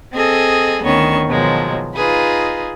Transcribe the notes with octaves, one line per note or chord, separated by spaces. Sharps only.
C4 G#4 A4 D#5
D2 D#3 B3 C#4 C#6
B2 D#3 F3 F#3 G#3
D#4 F4 G#4 B4